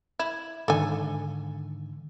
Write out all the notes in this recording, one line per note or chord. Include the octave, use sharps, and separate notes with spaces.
E4 G#6
G#2 D3 D#3 A4 G#5